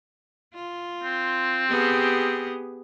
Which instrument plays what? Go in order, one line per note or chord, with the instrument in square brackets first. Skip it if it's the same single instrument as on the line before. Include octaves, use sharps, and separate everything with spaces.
[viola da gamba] F4
[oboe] C4
[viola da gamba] B3 G4 G#4